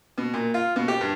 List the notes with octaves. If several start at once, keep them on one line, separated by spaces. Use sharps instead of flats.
B2
A#2
F4
B2
G4
G2